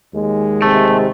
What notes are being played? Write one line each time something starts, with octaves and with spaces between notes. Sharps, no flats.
D#2 G#3
C3 A3